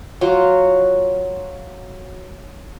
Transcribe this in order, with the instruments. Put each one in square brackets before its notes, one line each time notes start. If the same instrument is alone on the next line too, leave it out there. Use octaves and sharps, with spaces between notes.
[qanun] F#3 F4